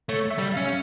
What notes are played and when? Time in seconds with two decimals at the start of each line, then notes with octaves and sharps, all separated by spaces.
0.09 A3 C#5
0.30 E5
0.38 G3
0.53 C#4 F5